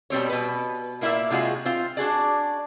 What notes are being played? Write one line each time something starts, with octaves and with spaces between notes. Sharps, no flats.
B2 G3 C4 C#5
B2 B4
A#2 A#3 E4 A#4 D5 E5
C3 G#3 F4 F#4 G#4
C4 F4
D4 F#4 G#4 D5